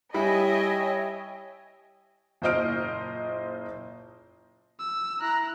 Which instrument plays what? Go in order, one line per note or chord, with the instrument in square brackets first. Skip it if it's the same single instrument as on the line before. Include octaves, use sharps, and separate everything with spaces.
[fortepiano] G3 E4 [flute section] C#5 G5 [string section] D#5 E5 G#5
[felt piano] F#1 A#2 C5 D#5 F6 D7
[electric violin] E6
[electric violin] E4 F#6 [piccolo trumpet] A#5